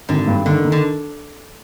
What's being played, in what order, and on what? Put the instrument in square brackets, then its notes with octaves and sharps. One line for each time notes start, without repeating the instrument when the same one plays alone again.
[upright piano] G#1 [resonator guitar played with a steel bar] D3
[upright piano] G2
[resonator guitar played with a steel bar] D3 [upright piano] D#3
[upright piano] D#3
[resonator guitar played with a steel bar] D3